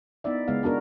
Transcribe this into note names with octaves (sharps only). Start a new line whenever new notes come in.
B3 D#4 E4 D5 E5
C#3 G#3 B3 F5
B3 D4 F#4 A#4